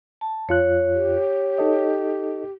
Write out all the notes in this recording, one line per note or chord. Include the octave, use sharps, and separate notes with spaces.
A5
F2 F4 C#5 F#6
G4
D#4 A4 D#5